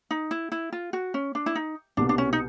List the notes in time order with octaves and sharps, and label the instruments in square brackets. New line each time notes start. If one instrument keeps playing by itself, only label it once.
[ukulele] D#4
E4
E4
F4
F#4
C#4
D4
E4
D#4
[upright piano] C2 B2 G3 B3 [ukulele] D4
[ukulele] D4
C#4
D#4